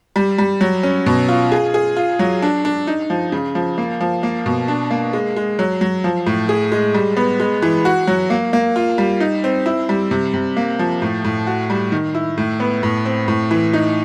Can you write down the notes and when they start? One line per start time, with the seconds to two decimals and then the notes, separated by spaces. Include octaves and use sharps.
0.16 G3
0.38 G3
0.61 F#3
0.83 C#4
1.06 B2
1.28 F4
1.52 G#4
1.74 G#4
1.97 F4
2.19 F#3
2.42 D4
2.65 D4
2.87 D#4
3.10 F3
3.32 C#3
3.55 F3
3.78 A#3
4.00 F3
4.23 A#3
4.46 B2
4.68 D4
4.91 A#3
5.13 G#3
5.36 G#3
5.59 F#3
5.81 F#3
6.04 F3
6.26 A2
6.49 G#4
6.72 G#3
6.94 G3
7.17 B3
7.40 G#3
7.62 E3
7.85 F#4
8.07 F#3
8.30 A#3
8.53 A#3
8.76 F4
8.98 G3
9.20 D#4
9.44 C4
9.66 E4
9.89 G3
10.11 C3
10.34 C3
10.57 A#3
10.79 F3
11.02 A2
11.24 A2
11.47 F#4
11.70 G3
11.92 D#3
12.15 E4
12.38 A2
12.60 B3
12.83 A2
13.05 C4
13.28 A2
13.51 E3
13.73 D#4